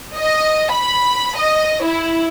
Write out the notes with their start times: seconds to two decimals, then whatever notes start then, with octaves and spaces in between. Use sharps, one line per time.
0.16 D#5
0.73 B5
1.38 D#5
1.83 E4